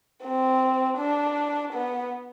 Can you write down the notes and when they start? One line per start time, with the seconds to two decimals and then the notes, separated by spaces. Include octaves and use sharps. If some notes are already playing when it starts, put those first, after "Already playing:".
0.23 C4
0.97 D4
1.73 B3